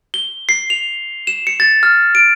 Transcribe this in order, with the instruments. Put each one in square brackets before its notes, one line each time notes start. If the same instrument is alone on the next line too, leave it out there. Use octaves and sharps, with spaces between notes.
[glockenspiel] G7
C7
F7
E7
C#7
A6
F6
D7